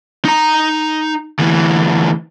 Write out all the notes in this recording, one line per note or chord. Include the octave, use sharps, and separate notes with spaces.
D#4 A#5
D2 E3